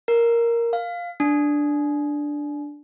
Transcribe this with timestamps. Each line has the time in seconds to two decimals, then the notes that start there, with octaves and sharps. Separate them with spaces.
0.08 A#4
0.73 F5
1.20 D4